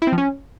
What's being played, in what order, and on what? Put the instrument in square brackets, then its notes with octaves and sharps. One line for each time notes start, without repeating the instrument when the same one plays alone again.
[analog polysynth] E4
C4
F3
C#4